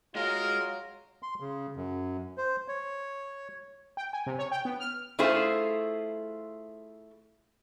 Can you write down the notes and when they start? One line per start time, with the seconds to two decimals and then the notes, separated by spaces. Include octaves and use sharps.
0.15 F#3 G#3 F4 A#4
1.23 C6
1.40 C#3
1.76 F#2
2.38 C5
2.68 C#5
3.97 G5
4.13 G#5
4.26 C3
4.39 C#5
4.51 G5
4.65 B3
4.80 F6
5.19 A3 E4 F4 G#4 C5